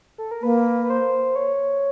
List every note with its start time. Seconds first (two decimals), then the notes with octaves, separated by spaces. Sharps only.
0.18 A4
0.31 A#4
0.42 A#3 B4
0.84 B4
0.90 C5
1.36 C#5